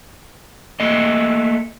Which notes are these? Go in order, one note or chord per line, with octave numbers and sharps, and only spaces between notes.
A3 A#3 D#5